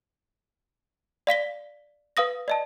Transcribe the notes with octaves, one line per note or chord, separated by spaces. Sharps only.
D5 F5 B6 G7
B4 F5 D#6 A#6
D5 D#5 A5